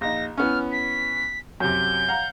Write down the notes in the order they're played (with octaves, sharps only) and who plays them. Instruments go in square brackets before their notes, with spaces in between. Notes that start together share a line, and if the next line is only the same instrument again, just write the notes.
[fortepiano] A#1 D#4 [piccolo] A#6
[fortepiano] E3 B3 C#4 [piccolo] F6
[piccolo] B6
[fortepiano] F#2 C3 [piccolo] G6
[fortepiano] F5 F#5 A#5